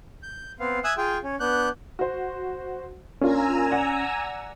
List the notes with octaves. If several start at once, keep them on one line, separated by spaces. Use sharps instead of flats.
G6
B3 C4 F5
E5 G#5 D#6 E6 F#6
F4 G#4 G5
C#4
B3 D4 F#6 G6
F#4 C5
A#3 C#4 D4 F4 G#5 A#5 E6
D5 F#5